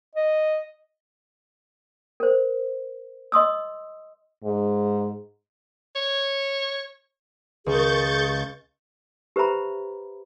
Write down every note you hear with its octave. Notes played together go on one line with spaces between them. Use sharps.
D#5
A#4 C5
D#5 C6 D#6 E6
G#2
C#5
C#2 G#4 C#6 G6 A6
G4 B4 C5 E5 A#5 B5